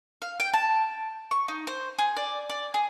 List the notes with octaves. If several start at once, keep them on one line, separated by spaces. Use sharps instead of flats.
F5
G5
A5
C#6
D#4
C5
G#4
D5
D5
G#4